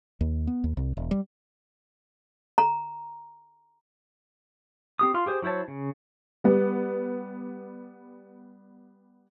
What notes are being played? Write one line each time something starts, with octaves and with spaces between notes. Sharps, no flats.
D#2
B3
D#2
C2
E1
G3
A#5
C4 G4 D#6
F4 F5 C6
G4 G#4 C5
F#3 E4 C5 C#5 A5
C#3
G3 B3